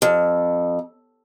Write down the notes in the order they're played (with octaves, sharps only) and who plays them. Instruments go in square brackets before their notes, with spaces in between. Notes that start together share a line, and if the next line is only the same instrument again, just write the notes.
[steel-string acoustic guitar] F2